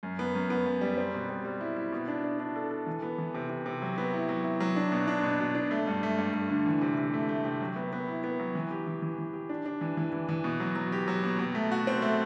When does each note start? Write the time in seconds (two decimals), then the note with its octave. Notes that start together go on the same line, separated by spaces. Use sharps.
0.03 F#2
0.19 B3
0.35 F#2
0.50 B3
0.66 F#2
0.81 G3
0.97 C4
1.14 B2
1.29 G3
1.45 G3
1.61 E4
1.76 E4
1.92 B2
2.08 D4
2.24 D4
2.40 D4
2.56 A4
2.71 A4
2.87 E3
3.02 B3
3.18 E3
3.34 C3
3.50 C3
3.66 C3
3.82 F#3
3.98 B3
4.13 E4
4.29 F#3
4.44 E4
4.60 F#3
4.76 D4
4.92 B2
5.08 D4
5.23 B2
5.40 B2
5.55 D4
5.71 A3
5.87 G2
6.03 A3
6.18 G2
6.34 A3
6.50 D3
6.66 E3
6.81 C3
6.97 C3
7.14 A3
7.29 A3
7.45 C3
7.61 F#3
7.76 B3
7.93 B3
8.08 E4
8.24 B3
8.40 F#3
8.55 E3
8.71 G4
8.87 E3
9.02 E3
9.18 E3
9.34 G4
9.49 D4
9.66 D4
9.81 E3
9.97 E3
10.12 E3
10.29 E3
10.44 B2
10.60 F#3
10.76 F#3
10.92 G4
11.08 F#3
11.23 B2
11.39 B2
11.55 A3
11.71 F#4
11.87 C4
12.02 A3